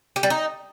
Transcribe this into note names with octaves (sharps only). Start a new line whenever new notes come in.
G4
G3
D#4